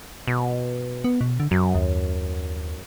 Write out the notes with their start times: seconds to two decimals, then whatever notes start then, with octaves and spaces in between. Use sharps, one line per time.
0.27 B2
1.04 B3
1.21 B2
1.40 D3
1.51 F#2 F#3
1.75 D#2